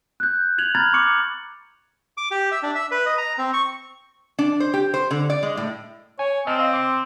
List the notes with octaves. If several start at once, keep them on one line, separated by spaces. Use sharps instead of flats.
F#6 G6
G6 G#6 F7 F#7
A#5 B5 F6 G#6 A6
C#6 D6 C#7 F#7
D6
G4
E5
D4
E5
B4
D#5
A#5
C4
C#6
D4
C5
G4
C5
D3
D5
G#3
A2
C#5 G#5
C4 D#5 A5 F6
D#5 F5
C6 D6